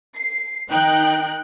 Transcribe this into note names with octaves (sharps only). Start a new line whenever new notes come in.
C7
D#3 D#4 G5 F#6